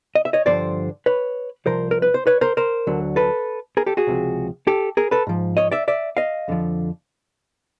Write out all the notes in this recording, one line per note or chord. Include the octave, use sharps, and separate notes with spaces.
D#5
E5
C#5 D#5
G2 D3 F3 C5 D5
B4 C#5
C2 C3 F3 A#4 C5
A#4
B4
C5
B4 C#5
A#4 C5
A#4 C5
D2 D3 F#3
A4 B4
G#4 A#4
G4 A4
F#4 G#4
C#2 C3 F3
G4 A4
G#4 A#4
A4 B4
G#2 F3
C#5 D#5
D5 E5
D5 E5
D#5 F5
F2 D3 F3